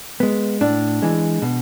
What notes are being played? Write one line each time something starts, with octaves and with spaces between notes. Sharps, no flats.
G#3 B3
A2 D4
E3 G#3
B2